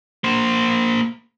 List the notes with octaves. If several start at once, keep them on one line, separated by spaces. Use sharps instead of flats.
A#3 C5